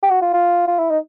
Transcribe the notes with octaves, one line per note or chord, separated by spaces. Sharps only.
G4
F#4
F4
F4
F4
E4
D#4